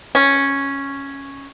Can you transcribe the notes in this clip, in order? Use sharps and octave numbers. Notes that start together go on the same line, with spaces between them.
C#4